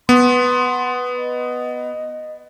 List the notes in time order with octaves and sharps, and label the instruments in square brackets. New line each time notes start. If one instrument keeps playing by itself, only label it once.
[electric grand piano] B3 [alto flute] C6
[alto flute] D#5